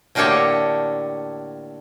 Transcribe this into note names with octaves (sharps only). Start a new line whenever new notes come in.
A2 D3 A#3 G4 A4 C#5